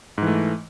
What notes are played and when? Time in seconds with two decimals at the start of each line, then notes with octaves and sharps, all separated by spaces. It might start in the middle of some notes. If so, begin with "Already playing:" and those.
0.18 G#2
0.22 E3
0.27 A3